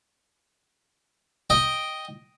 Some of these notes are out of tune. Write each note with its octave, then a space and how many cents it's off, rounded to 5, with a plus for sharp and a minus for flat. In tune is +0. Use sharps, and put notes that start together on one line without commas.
D#5 +0 G5 +0